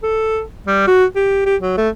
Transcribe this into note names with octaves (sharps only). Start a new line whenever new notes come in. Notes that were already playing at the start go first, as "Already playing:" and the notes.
A4
G3
F#4
G4
G4
F#3
A3